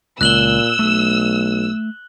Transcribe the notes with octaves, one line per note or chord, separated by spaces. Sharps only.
C#2 A#2 E6 F#6 F#7 G7
B1 A3